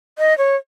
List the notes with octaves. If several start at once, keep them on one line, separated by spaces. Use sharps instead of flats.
D#5
C#5